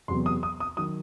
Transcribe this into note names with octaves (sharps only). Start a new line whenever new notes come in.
E2 C3 F#3 B3 C6
D#6
D#6
D#6
D#3 F#3 D#6